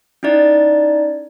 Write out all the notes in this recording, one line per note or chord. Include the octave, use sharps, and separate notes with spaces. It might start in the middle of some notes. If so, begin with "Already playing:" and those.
C#4 D#4 E4 D5 A6